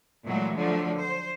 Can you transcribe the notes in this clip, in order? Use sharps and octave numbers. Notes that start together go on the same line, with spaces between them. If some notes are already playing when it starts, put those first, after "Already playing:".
A#2 E3 F#3 G#3 A3
D3 F3 F#3 A3
C5